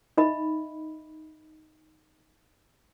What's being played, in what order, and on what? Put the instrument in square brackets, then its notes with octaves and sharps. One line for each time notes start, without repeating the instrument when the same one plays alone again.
[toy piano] D#4 D#5 E5 B5